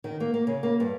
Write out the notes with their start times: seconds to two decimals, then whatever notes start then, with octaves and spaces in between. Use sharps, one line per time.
0.04 D#3
0.20 A#3
0.34 A#3
0.47 C#3
0.63 A#3
0.80 G2